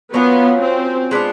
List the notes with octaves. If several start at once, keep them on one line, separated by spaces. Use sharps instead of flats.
F#3 A#3 B3 C#4 F4
C4
G#3 B3 D4 F4